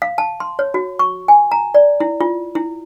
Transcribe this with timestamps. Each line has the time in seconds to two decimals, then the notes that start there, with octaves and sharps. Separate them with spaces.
0.02 F5
0.18 A5
0.40 C6
0.59 C#5
0.74 F#4
0.99 C#6
1.28 G#5
1.52 A#5
1.75 D5
2.00 E4
2.21 F4
2.55 E4